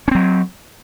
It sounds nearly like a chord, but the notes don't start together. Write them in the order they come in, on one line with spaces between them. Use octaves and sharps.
C#4 C4 F#3